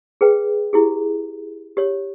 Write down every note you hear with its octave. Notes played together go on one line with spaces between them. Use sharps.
G#4 B4 G5
E4 G4 G#4
G4 C#5